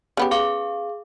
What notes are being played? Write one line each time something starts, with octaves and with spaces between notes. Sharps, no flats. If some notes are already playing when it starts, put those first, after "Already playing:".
C#3 B3 G4
G#4 F5 D6